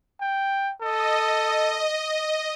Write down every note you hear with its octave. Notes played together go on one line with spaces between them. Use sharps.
G5
A4 D#5